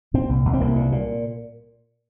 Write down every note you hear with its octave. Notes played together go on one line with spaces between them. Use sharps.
A#2 C4
C2
C2
C4
C2 A#3
A#2
A#2